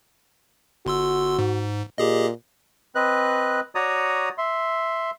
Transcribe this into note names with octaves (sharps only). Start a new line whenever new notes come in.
G1 F#4 C6 E6
G#2
A#2 G4 G#4 D#5
C4 B4 D#5 F#6
F#4 C#5 D5 A#5 D#6
E5 C6